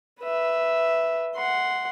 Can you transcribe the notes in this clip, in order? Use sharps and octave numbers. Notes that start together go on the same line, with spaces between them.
B4 E5
F#5 C6